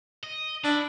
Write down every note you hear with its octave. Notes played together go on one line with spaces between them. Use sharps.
D#5
D4 E4